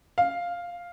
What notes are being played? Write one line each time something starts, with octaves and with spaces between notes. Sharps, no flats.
F5